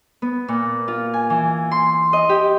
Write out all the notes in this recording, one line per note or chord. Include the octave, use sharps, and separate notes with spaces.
B3
A#2
F4
G#5
E3
C6
D#5
G4